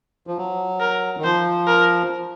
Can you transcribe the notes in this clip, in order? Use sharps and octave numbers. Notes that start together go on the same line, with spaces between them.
F3
F#3
A#4
D#3
F3 C5
A#4